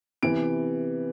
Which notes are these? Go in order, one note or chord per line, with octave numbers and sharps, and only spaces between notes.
C3 E3 B3 D7